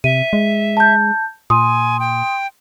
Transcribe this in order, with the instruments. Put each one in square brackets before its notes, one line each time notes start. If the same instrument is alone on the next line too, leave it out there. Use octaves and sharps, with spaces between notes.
[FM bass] C3 [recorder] E5 [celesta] D#7
[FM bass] G#3
[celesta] A5 G6
[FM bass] A#2 [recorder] G#5 [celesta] C6 D#6
[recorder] G5